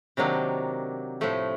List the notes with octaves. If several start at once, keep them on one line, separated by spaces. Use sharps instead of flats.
C3 D#3 F#3 A#3 D4
A2 F3 A3